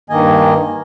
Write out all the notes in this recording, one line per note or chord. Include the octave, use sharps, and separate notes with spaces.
G2 D#3 A#3 D#5 G#5